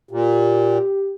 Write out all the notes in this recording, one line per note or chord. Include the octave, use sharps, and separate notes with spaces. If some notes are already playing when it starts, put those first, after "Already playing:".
A#2 G4